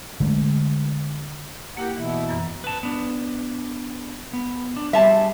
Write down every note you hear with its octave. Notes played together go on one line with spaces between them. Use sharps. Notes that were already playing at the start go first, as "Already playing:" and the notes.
D3 G#3 A3
A#3 E4 G4 A#4 F#5
B2 E3 E4
F#2 E3
B4 A5
B3 D4
B3
D4
G3 C4 G#4 E5 A5